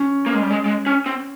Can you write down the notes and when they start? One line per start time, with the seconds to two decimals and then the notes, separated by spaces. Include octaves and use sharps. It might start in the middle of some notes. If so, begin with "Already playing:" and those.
Already playing: C#4
0.26 A#3
0.34 G#3
0.42 G3
0.51 G#3
0.66 G#3
0.86 C#4
1.06 C4